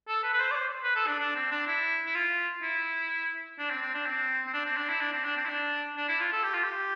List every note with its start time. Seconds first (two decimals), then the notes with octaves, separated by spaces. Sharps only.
0.08 A4
0.23 B4
0.33 B4
0.40 C5
0.51 D5
0.55 C5
0.84 B4
0.96 A4
1.07 D4
1.19 D4
1.35 C4
1.52 D4
1.67 E4
2.06 E4
2.15 F4
2.62 E4
3.58 D4
3.70 C4
3.82 C4
3.94 D4
4.06 C4
4.47 C4
4.53 D4
4.65 C4
4.77 D4
4.89 E4
5.01 D4
5.13 C4
5.25 D4
5.37 C4
5.45 E4
5.49 D4
5.97 D4
6.09 E4
6.20 F4
6.33 A4
6.43 G4
6.54 F4
6.63 G4